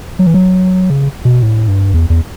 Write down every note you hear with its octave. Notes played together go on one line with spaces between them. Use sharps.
F#3
E3
F#3
C#3
B2
A2
G2
E2
E2